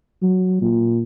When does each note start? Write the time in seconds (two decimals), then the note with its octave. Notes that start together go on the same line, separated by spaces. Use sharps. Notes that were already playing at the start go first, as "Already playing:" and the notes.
0.22 F#3
0.62 A#2